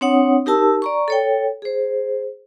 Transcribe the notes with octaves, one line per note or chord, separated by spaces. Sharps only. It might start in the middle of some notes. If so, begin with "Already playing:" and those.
C4 D4 C#5 F#5 D#6
D#4 G4 A#4 A5 E6
D5 A#5 C#6
A4 C#5 G5
G#4 C5